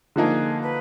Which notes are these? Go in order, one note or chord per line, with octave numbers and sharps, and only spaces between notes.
D3 F3 A#3 D#4 G#4
B4